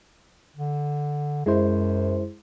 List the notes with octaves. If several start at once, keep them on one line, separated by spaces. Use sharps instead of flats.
D3
F#2 G#3 E4 C5